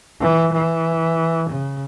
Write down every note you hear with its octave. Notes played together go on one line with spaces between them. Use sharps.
E3
E3
C#3